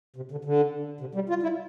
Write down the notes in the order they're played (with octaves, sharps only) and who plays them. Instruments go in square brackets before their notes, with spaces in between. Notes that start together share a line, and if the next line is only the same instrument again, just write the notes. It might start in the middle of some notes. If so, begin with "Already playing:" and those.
[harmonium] C3
D3
D3
C3
G3
F4
E4